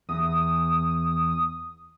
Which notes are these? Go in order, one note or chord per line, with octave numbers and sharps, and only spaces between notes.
E2 D#6